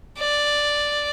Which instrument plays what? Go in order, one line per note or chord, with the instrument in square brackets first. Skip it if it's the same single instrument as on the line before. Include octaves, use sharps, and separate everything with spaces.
[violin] D5